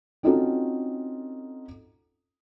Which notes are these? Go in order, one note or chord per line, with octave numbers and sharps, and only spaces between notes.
C4 C#4 D#4 F4 F#4 A4